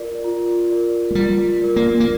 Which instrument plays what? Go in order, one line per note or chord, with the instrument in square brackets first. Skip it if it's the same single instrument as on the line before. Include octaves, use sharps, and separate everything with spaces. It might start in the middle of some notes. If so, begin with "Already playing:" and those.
Already playing: [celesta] F4 A#4 D5
F4
A#4 D5
[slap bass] A3
[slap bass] G3 [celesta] F4
[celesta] A#4 D5
[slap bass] A#3
A#3